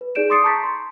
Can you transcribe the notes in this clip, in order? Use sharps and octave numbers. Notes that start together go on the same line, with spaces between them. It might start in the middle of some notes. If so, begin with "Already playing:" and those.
B4
D#4 G#4 D5 G6 D7 E7
C6 D6 D#6 A6 C7 C#7
A5 A#5 C#6 G6 A6 B6
C6